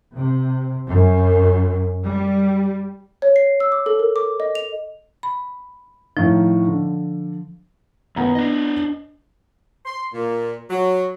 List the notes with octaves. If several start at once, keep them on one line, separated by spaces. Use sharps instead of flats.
C3
F#2
G3
C#5
C7
E6
D6
A4
A#4
D6
D#5
F7
B5
A2 D#3 F3
D3
D#2 B3 A#5
D4 D#5
C6
A#2
F#3